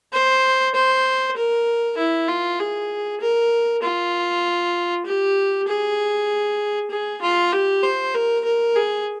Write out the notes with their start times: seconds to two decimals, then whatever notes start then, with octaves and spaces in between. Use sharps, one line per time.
0.13 C5
0.75 C5
1.36 A#4
1.98 E4
2.28 F4
2.59 G#4
3.21 A#4
3.83 F4
5.06 G4
5.68 G#4
6.91 G#4
7.22 F4
7.53 G4
7.84 C5
8.15 A#4
8.45 A#4
8.76 G#4